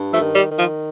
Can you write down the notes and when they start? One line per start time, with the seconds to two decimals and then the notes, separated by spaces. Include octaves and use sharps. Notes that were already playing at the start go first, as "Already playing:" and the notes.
Already playing: G2
0.12 F3 A3
0.19 D#3
0.35 G3
0.50 D#3
0.57 F3